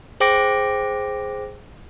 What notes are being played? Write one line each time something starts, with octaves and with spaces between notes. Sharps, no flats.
G#4 C5 G5 D6 A#6 D7